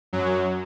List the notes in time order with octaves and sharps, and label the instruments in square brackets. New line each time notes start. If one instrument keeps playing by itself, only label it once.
[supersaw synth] F#2 F#3